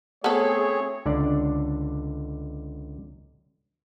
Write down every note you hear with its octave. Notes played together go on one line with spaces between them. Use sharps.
A3 B3 C4 G#4 A4 C#5
C#2 D3 D4 D5